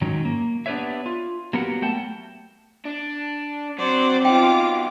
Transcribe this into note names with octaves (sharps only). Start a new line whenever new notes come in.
G#2 D#3 F#3 C#4
A#3
B3 D4 G4 B4 C#5 E5
F4
F#3 A#3 B3 G4 A#4 F#5
A3 F#5 G5 A5
D4
F#3 C4 C5 D5
B2 D#4 F4 G5 D6